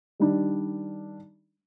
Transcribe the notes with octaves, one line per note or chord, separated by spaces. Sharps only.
D#3 G3 D4